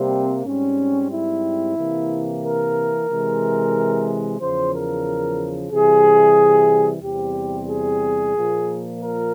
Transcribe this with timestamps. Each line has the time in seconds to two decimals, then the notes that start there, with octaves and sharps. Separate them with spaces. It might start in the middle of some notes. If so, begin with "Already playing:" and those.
Already playing: C3 G3 A#3 C4
0.45 G#2 G3 C4 C#4
1.11 E4
1.77 C3 E3 A#3
2.43 A#4
3.08 C3 E3 G#3
4.40 E2 C#3 F3 C5
4.73 A#4
5.72 C3 E3 G3 G#4
7.03 E2 C3 G3 C4 G4
7.68 G#4
8.34 A#2 F3 A#3
9.00 A#4